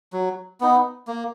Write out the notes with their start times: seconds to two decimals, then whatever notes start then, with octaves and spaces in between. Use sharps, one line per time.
0.13 F#3
0.61 B3 D#4
1.07 A#3